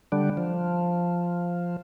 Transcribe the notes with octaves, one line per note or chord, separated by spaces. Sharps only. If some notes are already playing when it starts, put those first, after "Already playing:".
D3 G3 D4
F3